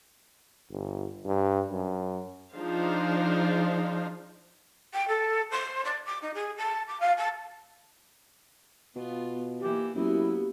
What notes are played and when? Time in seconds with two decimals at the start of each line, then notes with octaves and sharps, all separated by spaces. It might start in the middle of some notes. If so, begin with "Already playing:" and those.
0.71 G1
1.25 G2
1.70 F#2
2.53 F3 D4 D#4 G#4 C5 F5
4.93 G5
5.08 A4
5.50 C5
5.84 D5
6.05 D6
6.22 D#4
6.34 G#4
6.57 A5
6.87 D6
7.00 F5
7.17 A5
8.96 B2 B3 F4
9.60 E3 A#3 G4
9.95 F#2 A#3 B3 E4 F#4 G4